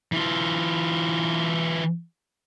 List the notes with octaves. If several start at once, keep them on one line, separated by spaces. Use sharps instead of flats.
E3 F4